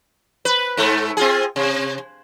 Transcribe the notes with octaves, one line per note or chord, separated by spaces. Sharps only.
B4
G#2 A3
C4 F4 G#4
C3